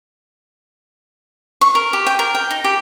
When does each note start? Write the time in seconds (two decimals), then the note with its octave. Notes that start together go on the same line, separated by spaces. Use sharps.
1.61 C#6
1.75 A#4
1.93 G4
2.07 G5
2.19 A#4
2.35 G5
2.51 D#4
2.64 G4